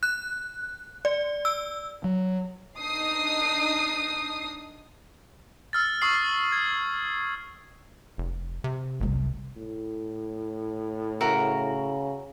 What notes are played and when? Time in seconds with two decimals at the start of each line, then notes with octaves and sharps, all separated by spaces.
0.03 F#6
1.05 D5
1.45 E6
2.04 F#3
2.79 D4 D#4 D#6 C7
5.73 E6 F6 A6
6.01 C#6 D#6 E6 C7 F#7
6.52 G#6
8.18 F1
8.64 C3
9.00 G1 C2 F#2
9.56 A2
11.20 C#3 F#4 A#4 E5